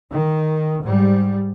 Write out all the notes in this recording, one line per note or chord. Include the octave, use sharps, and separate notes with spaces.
D#3
G#2 G3